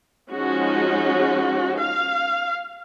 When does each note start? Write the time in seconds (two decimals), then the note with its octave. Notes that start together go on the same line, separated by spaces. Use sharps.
0.30 F3 G#3 C#4 D#4 F#4
1.79 F5